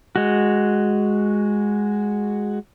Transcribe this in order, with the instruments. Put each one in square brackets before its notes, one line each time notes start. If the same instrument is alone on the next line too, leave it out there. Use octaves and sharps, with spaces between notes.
[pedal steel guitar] G#3 F#4